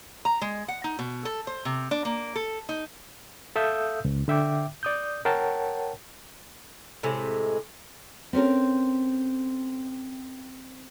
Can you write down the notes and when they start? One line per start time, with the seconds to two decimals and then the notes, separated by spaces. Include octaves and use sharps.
0.25 A#5
0.41 G#3
0.68 F#5
0.84 D#4
0.99 B2
1.25 A4
1.47 C5
1.65 C3
1.91 D4
2.05 A#3
2.36 A4
2.69 D#4
3.56 A4 E5 F5 D#6 E6 G6
4.05 C#2
4.28 D3 E5 G5 D6
4.83 D5 D#6 G6
5.25 A#4 C#5 F#5 G5 A5
7.03 A2 C3 G#3
8.33 C4 C#4 A4 A#4